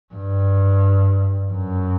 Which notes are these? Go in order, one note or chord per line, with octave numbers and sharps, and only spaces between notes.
G2
F#2